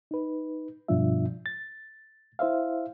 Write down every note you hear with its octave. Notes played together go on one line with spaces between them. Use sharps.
D#4 B4
G2 B2 F3 D4 F4 E5
A6
E4 C5 E5 F5